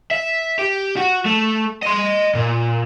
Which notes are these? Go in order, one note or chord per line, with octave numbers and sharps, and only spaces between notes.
E5
G4
F#4
A3
D#5 C6
A#2